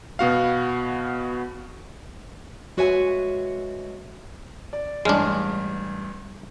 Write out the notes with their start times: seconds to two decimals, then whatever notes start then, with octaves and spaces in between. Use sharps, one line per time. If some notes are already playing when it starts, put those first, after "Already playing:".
0.19 B2 B3 F#4 F5
2.77 G#3 F#4 B4 C#5 E5 G#5
4.73 D5
5.05 A1 G2 G#3 D4 F6